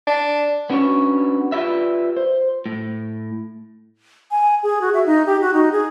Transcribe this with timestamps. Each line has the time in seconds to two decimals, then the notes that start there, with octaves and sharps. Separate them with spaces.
0.07 D4
0.70 B3 C#4 D4 F#4 C#5
1.52 F4 G4 B4 D5 E5
2.17 C5
2.66 A2
4.31 G#5
4.63 G#4
4.81 F#4
4.94 E5
5.06 D#4
5.26 G4
5.41 F#4
5.54 D#4
5.72 G#4